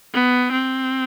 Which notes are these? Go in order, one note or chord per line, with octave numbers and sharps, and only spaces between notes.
B3
C4